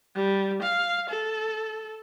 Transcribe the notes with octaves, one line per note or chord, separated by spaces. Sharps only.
G3
F5
A4